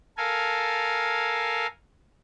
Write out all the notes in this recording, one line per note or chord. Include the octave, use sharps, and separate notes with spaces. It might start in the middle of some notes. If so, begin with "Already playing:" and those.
A4 A#4 F5 G#5